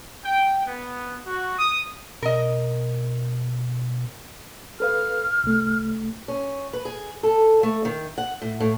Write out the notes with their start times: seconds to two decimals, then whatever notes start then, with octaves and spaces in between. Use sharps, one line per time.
0.25 G5
0.67 B3
1.26 F#4
1.59 D#6
2.22 B2 A#4 D#5
4.80 A4 B4 F5 F6
5.44 C2 A3
6.28 C#4
6.73 B4
6.85 G#4
7.23 A4
7.63 A3
7.85 D#3
8.18 F#5
8.42 A2
8.60 A2